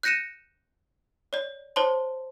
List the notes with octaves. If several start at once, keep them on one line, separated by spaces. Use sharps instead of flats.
F#6 G6 A#6 C#7 D#7 E7
C#5 D5
C5 C#5 A5 C6